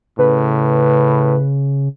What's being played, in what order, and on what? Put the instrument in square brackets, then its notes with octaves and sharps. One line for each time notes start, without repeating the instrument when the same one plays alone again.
[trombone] A2 [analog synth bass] C#3 [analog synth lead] B4